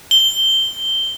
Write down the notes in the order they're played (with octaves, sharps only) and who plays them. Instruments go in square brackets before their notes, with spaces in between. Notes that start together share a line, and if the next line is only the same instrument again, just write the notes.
[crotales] G7